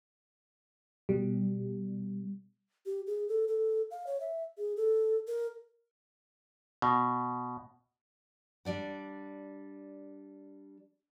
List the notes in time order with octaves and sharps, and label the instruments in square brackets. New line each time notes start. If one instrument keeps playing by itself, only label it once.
[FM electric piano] B2 G3
[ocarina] G4
G#4
A4
A4
F5
C#5
E5
G#4
A4
A#4
[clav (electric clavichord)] B2
[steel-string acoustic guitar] G3 D4 D5 F#5